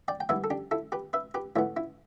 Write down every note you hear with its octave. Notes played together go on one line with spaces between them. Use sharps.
D5 G5
G5
G2 E3 B3 B4 E5
A4
D4 G4
E4 A4
G4 B4
B4 E5
G4 B4
A2 E3 B3 E4
E4